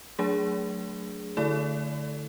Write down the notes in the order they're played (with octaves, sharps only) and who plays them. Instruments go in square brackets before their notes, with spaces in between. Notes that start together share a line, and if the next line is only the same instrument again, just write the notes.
[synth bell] F#3 A3 D4 G#4
D3 A3 E4 A4 D5